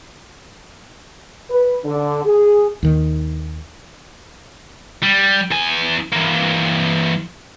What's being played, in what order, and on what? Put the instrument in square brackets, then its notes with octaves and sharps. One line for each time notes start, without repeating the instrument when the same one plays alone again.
[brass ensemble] B4
D3
G#4
[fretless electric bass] D#2 D#3
[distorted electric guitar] G3
E2 G#5
E3 A#3